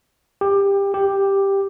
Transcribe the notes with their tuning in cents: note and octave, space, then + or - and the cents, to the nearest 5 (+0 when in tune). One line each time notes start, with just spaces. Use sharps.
G4 +20
G4 +5